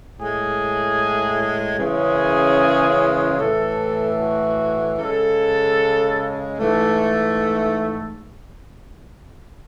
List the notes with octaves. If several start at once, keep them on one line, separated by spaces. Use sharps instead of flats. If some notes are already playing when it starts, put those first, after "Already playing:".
A2 G#3 G#4
F#2 C#3 E3 G#3 G#4
A2 E3 A3 A4
F#4
C#3 G#3 A4
G#2 E3 A3